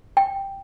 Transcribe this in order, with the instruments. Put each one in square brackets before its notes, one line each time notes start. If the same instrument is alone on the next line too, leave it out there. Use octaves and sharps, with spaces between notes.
[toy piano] G5